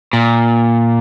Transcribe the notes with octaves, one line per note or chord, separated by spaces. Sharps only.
A#2